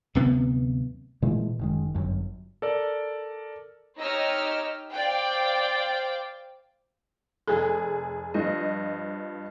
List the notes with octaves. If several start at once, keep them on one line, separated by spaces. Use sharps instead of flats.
D1 G2 C3 B3
A#2 E3 G#3 A3
F#1 D#3 G#3
G1 F#2
A4 A#4 D5
D#4 G4 C#5 D#5 E6 F6
C5 D5 F5 G5
F1 G#4 A4
G2 F3 D#5